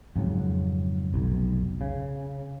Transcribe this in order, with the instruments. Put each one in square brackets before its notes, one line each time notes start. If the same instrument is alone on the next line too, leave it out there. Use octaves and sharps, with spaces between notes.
[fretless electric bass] F2 G#2 C#3 F#3
F1 B1
C#3